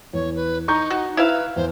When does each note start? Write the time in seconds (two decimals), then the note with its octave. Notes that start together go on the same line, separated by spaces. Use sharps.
0.13 E2 C#5
0.36 B4
0.68 D#4 A#5 C#6 G6
0.90 F#4
1.17 E4 B4 E5 F5
1.56 E2 C5